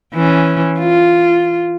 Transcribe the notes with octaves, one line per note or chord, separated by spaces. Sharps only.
E3 C#4
F4